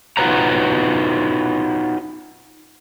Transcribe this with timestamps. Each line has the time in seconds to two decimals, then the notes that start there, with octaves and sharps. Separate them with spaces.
0.17 D#4 F4 F#4 B4 C#5 A#5